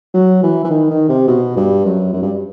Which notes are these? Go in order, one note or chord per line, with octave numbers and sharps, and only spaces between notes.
F#3
E3
E3
D#3
D#3
C3
B2
G2
F#2
F#2
G2